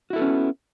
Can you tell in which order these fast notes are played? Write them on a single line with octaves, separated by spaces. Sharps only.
F#4 E4 A4 B3 C#4